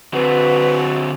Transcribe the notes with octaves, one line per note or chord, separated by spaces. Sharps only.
D3 C4 F#4 B4